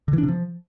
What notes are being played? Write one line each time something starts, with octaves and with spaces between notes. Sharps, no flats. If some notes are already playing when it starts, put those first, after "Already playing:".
D3
E3
D4
C3
F3